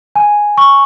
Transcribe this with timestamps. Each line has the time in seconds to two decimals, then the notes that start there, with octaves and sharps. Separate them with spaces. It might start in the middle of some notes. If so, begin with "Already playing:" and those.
0.16 G#5
0.58 C#6